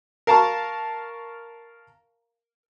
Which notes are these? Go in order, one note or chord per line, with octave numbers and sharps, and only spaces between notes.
A#4 F5 A5 A#5 C#6